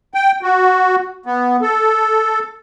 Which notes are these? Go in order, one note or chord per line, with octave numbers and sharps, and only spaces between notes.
G5
F#4
B3
A4